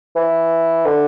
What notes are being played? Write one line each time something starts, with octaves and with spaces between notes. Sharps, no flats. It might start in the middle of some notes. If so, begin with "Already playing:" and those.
E3
D3